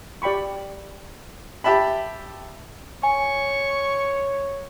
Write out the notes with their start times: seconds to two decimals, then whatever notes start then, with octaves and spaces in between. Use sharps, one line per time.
0.22 G4 D5 G5 B5 C#6
1.64 G4 E5 A5 B5
3.03 C#5 G#5 C#6